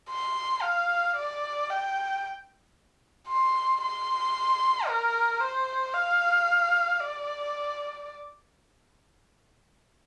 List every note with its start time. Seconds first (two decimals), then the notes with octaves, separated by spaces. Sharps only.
0.10 C6
0.62 F5
1.16 D5
1.70 G5
3.29 C6
3.82 C6
4.88 A#4
5.40 C5
5.94 F5
7.00 D5